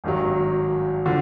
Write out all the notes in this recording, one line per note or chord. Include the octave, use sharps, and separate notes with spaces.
G#1 G2 D#3 F#3
D3 F3